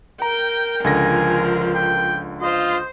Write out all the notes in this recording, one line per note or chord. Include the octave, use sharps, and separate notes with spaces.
A#4 G5 A#5
C#2 D3 F3 G#5 A#6
G5
F4 C5 D#5